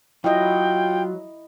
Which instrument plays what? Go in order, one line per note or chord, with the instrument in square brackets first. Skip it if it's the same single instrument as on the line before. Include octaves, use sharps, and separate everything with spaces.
[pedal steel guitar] F#3 [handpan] E4 D#5 [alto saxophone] F4 [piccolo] G5